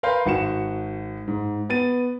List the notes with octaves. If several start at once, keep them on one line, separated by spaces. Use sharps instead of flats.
A#4 B4 F5 C6 G6
G#1 F#4 C#7 E7
G#2
B3 A6 D#7